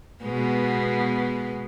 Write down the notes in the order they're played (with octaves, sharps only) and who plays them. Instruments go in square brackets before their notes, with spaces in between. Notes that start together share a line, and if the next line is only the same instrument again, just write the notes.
[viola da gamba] B2 G#3 B3